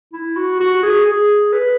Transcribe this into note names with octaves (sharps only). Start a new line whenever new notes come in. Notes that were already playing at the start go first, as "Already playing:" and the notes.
E4
F#4
F#4
G#4
G#4
B4